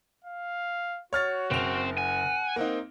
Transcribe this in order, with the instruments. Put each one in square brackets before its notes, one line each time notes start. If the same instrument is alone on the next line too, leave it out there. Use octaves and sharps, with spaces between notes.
[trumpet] F5
[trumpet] F#4 [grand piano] C#5 F6 A6
[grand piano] F#1 F7 [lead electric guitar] C4
[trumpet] F#5 [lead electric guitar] G#5
[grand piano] A#3 C4 D#4